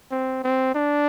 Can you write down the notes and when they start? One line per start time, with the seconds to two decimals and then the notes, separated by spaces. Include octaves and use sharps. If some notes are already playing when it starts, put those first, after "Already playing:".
0.11 C4
0.44 C4
0.75 D4